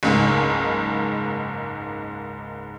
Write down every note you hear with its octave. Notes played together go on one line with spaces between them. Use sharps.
F#1 C#2 G#2